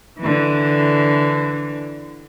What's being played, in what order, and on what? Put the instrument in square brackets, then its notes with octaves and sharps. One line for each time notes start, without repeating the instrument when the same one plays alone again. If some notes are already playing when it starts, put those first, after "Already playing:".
[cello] D3 E3